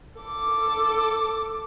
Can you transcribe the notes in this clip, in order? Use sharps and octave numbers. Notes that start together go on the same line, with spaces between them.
A4 D6